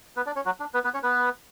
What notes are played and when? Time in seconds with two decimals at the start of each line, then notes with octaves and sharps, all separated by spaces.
0.17 B3 B4
0.26 D4 D5
0.36 C#4 C#5
0.45 F#3 F#4
0.60 D4
0.74 B3 B4
0.84 B3 B4
0.94 C#4 C#5
1.03 B3 B4